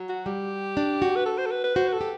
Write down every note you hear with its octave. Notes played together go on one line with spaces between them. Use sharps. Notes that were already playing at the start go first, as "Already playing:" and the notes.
Already playing: F#3
F#4
G3 G4
D4
F#4
B4
A4
C5
A4
B4
B4
F#4 C5
B4
A4
G4